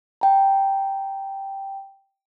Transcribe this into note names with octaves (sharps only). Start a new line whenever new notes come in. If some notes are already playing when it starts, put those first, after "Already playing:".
G5 A#5